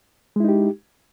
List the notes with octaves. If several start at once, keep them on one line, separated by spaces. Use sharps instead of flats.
G#3 D#4 E4 G4